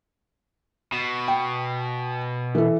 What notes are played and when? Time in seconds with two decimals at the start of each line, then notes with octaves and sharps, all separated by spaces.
0.92 B2
1.28 G5
2.55 E3 A4